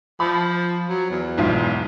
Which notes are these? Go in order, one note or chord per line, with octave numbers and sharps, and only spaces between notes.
F3 B5
F#3
E2
B1 G#2 F4